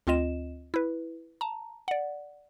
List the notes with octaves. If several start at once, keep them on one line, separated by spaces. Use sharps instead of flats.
D2 C4 F4 D#5 E7
E4 B4
A5 A#5
D5 F#5